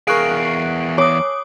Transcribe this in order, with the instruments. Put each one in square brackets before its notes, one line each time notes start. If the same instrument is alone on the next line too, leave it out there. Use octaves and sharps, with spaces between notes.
[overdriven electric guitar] E2 F5 [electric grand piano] G#4 A#4 [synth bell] C#6 F#6 D7
[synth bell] C#5 D#6 [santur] D6